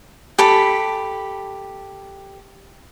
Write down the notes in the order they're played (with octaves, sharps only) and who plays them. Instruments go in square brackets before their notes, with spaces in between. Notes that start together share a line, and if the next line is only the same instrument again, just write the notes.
[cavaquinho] G4 A4 B5